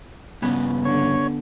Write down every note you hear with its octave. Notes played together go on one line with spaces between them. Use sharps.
G2 C#3 B3 C#4
D3 C#5